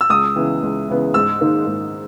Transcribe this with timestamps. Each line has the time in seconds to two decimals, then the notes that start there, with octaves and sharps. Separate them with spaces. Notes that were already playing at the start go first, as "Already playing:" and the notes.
0.01 E6
0.10 C#2 D#6
0.36 C#3 E3 B3
0.63 C#2
0.88 C#3 E3 B3
1.14 G#2 E6
1.41 D#3 A#3 D#4
1.66 G#2